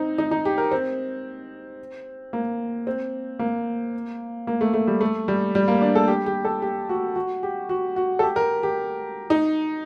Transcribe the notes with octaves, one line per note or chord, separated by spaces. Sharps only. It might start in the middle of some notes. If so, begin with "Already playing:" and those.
Already playing: C4 D#4
D#4
D#4
G4
A#4
C4
A#3
C4
A#3
A#3
A3
A3
G3
A3
G3
G3
A#3
D4
A4
G4
G4
A4
G4
F#4
F#4
G4
F#4
F#4
A4
G4
A#4
G4
D#4